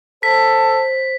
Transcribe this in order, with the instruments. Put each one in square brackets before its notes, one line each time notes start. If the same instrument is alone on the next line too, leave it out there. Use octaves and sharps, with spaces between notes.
[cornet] A4 [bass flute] C5 [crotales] B6